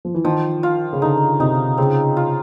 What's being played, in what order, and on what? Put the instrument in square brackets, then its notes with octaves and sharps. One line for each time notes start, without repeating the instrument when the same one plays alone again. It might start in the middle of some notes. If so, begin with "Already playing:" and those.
[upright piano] F3
E3
[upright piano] D#3 [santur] F3
[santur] F4
[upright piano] C#3
[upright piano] D3 [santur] D#4
[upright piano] C3 [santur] D#4
[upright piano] C#3 [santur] C4
[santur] F4